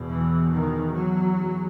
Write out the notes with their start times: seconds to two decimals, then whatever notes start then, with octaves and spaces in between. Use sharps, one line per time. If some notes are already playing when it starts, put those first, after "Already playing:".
Already playing: E2 B2
0.10 E3
0.53 D#3
0.95 F#3
1.37 E2